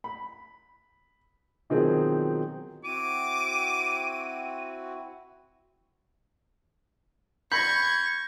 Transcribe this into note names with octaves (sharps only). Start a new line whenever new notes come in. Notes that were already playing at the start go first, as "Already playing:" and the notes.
B5
B2 D#3 F3 F#3 C4 G#4
C4 E4 F#4 D6 D#7
B5 C#6 G6 G#6 A#6